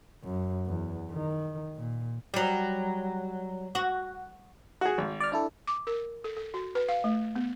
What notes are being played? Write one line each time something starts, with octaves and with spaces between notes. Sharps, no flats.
F#2
E2
D#3
A#2
F#3 G3
F#4
F#4 G#4
G#1
D5 F6
D4 E4 A4
D6
A#4
A4
A4
F#4
B4
F5
A3
B3